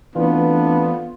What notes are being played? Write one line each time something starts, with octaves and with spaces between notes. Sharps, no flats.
E3 A3 B3 C4 D4 F4